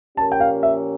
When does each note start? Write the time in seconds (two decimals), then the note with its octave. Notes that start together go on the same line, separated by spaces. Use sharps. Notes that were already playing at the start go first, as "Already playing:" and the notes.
0.17 A#2 F3 C#4 G4 A#4 A5
0.32 G5
0.40 F5
0.63 E5